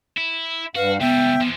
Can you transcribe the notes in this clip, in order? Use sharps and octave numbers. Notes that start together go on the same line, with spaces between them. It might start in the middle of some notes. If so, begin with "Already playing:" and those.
E4
G2 F#4 B4 F5
C#2 G3 B3 E5 G5
E3 F3